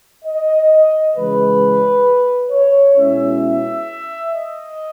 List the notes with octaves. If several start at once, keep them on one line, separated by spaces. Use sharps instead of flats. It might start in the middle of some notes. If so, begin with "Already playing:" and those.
D#5
C#3 E3 G#3 B4
C#5
B2 G#3 C#4 E4 E5
E5
D#5